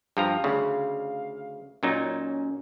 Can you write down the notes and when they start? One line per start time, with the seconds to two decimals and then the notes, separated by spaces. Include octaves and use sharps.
0.17 G2 F3 F5 A#5
0.44 D2 C#3
1.83 A#2 F#3 C#4 D#4